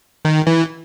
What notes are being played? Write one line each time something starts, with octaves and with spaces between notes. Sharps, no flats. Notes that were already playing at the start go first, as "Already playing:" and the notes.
D#3
E3